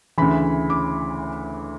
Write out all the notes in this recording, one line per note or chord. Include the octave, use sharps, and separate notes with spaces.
D2 C#3 E3 B5
D6